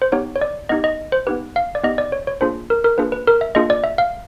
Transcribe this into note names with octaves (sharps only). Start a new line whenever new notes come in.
C5
B3 D#4 G4 C#5
C#5
D5
B3 D#4 G4 D#5
D#5
C5
B3 D#4 G4 B4
F5
D5
B3 D#4 G4 D#5
D5
C#5
C#5
A#3 D4 F4 G#4 C5
A#4
A#4
A#3 D4 F4 G#4 B4
B4
A#4
E5
A#3 D4 F4 G#4 D#5
D5
E5
F5